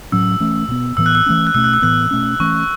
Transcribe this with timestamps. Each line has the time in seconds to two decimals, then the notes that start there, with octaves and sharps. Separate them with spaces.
0.12 A2 F#3 C#4 E6
0.40 E3 A3 C#4
0.68 B2 B3
0.97 A2 E3 B3 E6
1.06 F#6
1.15 E6
1.26 E3 A3 C#4
1.47 F#6
1.54 B2 A3 C#4 E6
1.64 F#6
1.74 E6
1.82 A2 E3 B3 F#6
2.11 B2 A3 C#4
2.40 E3 A3 C#4 C#6